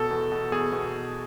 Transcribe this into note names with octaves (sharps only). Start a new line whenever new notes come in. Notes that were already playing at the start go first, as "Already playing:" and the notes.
Already playing: B2 A4
E2
B2
E2 G#4
B2